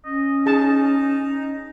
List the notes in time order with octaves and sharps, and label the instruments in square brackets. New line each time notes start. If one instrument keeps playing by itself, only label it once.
[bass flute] C#4 [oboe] D#5
[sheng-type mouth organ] D#4 [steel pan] G#4 A5 [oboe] D#5